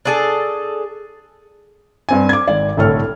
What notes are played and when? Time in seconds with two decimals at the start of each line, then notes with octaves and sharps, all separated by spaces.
0.05 D4 G#4 A4
2.09 G2 C4 G#5
2.29 D6 G#6
2.48 G#1 D5
2.77 G1 C2 A2 A4 C#5 F6